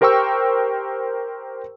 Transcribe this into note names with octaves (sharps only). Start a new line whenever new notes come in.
G4 A#4 C5 G5 C#6 E6